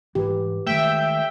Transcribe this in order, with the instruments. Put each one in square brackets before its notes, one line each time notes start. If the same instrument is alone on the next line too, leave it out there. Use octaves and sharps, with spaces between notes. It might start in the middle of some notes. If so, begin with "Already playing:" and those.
[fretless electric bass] G#2 E3 [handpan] G4 B4
[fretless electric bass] D#3 G#3 A3 [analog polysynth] E5 G5